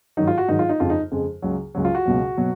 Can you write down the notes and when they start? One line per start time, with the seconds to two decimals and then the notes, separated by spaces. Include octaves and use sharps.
0.17 G#2 D#3 F#3 D#4
0.27 F4
0.38 F#4
0.48 G#2 D#3 F#3 D#4
0.59 F4
0.69 D#4
0.80 F2 C#3 G#3 F4
0.90 D#4
1.11 F2 C#3 G#3
1.42 C#2 C#3 F#3
1.75 C#2 C#3 F#3
1.85 F4
1.95 F#4
2.05 C#2 B2 F#3
2.37 B2 F#3